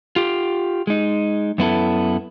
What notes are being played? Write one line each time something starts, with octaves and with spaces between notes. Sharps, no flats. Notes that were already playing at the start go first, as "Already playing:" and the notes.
F4 G4
G#3 D#4
F#2 B3 E4 A4